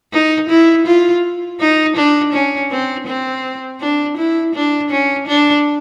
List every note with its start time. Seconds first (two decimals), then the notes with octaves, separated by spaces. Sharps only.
0.13 D#4
0.49 E4
0.86 F4
1.60 D#4
1.96 D4
2.33 C#4
2.71 C4
3.07 C4
3.80 D4
4.17 E4
4.55 D4
4.90 C#4
5.27 D4